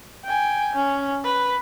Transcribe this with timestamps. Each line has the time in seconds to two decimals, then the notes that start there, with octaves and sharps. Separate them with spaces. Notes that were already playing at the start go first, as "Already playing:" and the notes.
0.25 G5 G#5
0.75 C#4
1.24 B4